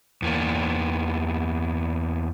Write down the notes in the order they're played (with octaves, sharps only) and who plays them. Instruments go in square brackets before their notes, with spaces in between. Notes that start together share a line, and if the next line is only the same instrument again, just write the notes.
[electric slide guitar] E2 A#3